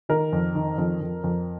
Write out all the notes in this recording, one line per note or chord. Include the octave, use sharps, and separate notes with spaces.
D#3 A#4
F2
D#3
F2
F2
F2